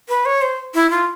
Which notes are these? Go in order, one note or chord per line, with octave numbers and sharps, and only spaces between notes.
B4
C#5
C5
E4
F4